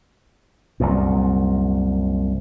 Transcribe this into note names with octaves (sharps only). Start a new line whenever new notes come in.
C2 F#2 A#2